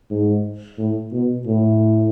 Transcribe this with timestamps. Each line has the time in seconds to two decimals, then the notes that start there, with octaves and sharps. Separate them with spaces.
0.11 G#2
0.78 A2
1.12 B2
1.46 A2